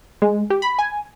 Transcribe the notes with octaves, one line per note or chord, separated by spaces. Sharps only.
G#3
G4
B5
G#5